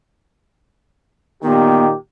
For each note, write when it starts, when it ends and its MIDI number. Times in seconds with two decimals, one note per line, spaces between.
1.43 1.91 46
1.43 1.91 51
1.43 1.87 59
1.43 1.96 67